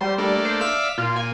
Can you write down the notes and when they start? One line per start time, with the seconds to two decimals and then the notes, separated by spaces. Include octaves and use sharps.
0.01 G3 C5
0.18 A3 A#3 D4
0.45 C5
0.61 D5 E5 F5 B6
0.98 A#2 F4
1.16 G#5